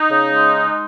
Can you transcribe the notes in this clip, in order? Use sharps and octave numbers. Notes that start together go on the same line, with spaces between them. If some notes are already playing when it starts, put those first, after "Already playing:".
Already playing: D#4
C#3
G#3